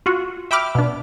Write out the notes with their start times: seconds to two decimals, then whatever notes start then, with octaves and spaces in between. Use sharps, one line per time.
0.06 F4 F#4
0.51 E5 G5 B5 D6 F6
0.75 B2 D4